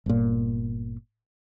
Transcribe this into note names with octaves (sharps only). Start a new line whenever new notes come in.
G1 A#2